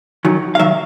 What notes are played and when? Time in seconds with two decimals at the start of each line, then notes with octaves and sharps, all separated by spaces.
0.25 F#2 D#3 F#3
0.55 F5
0.59 D#3 F#3 E5